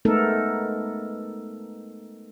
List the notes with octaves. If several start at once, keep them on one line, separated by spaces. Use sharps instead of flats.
G#3 A3 B3 D#4 A4 A#4